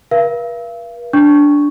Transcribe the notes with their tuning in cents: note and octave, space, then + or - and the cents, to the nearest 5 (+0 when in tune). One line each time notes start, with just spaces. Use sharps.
B4 -45 F5 -40
D4 -10 C#6 +0